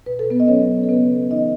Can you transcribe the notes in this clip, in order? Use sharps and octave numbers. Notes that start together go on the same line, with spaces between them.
B2 B4
A4
B3 B4
D#5
F#3 C#4 C#5
A4
C#3 B3 B4
E3 D#4 D#5